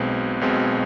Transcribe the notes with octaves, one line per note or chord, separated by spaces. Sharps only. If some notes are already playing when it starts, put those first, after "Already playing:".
Already playing: B1 B2 G#3 C4
B1 B2 G#3 C4